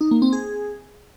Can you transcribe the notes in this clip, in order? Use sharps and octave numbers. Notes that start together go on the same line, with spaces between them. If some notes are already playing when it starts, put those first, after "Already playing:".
D#4
A#3
C4
G#4